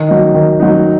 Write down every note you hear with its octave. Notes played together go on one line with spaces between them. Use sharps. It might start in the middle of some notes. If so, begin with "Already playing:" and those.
Already playing: D#3
F#3 D#4
D#3
F#3 D#4